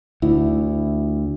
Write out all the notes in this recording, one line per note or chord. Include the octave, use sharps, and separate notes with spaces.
D2 E4